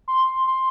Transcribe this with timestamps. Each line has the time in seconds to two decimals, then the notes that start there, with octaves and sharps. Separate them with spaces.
0.08 C6
0.47 C6